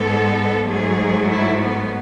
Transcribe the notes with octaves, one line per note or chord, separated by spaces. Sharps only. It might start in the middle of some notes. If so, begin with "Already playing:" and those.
Already playing: G#2 G#3 B3 A4
G#2 F#3 A3 G#4
E4
B3